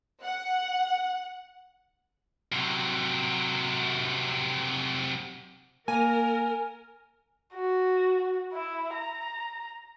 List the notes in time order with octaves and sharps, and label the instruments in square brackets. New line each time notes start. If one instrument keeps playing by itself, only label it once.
[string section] F#5
[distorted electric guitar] C3 F#3
[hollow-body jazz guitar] A#3 [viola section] A#4 [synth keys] G#5
[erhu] F#4
E4
A#5